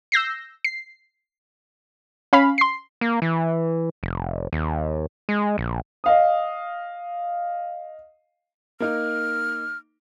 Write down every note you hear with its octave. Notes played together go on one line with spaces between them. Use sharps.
E6 G6 A#6 C7
C7
C#4 F5 B5
C6 C7
A#3
E3
F1
D#2
G#3
A#1
D#5 F5 D#6
A#3 D#4 F6